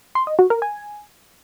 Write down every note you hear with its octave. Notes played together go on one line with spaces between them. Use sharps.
C6
D#5
F#4
A#4
G#5